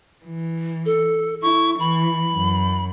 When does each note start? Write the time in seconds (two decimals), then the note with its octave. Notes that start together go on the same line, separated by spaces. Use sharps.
0.24 E3
0.86 A4
1.42 E4 C#6
1.80 E3 B5
2.34 F#2